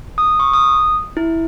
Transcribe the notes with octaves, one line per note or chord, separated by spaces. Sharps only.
D#6
C#6
D#6
E4